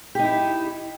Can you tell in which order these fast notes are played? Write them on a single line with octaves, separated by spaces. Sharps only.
G4 D#4 E4